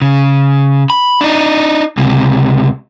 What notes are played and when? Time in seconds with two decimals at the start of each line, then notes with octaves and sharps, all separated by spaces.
0.02 C#3
0.90 B5
1.21 D4 D#4
1.98 C#2 C3